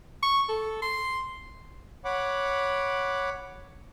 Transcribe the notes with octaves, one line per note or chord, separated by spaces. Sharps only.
C#6
A4
C6
C#5 F#5 B5 D6